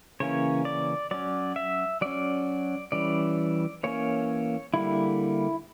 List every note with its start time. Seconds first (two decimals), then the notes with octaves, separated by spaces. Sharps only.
0.20 C#3 E3 A#3 C#4 C#5
0.65 D5
1.11 F#3 C#4 D5
1.56 E5
2.01 F#3 C#4 D5
2.92 E3 G3 C#4 D5
3.83 E3 A#3 C#4 C#5
4.74 D3 G3 A#3 E4